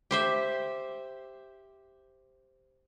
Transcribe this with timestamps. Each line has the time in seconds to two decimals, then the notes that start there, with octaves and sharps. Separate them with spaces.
0.11 G4 C5 E5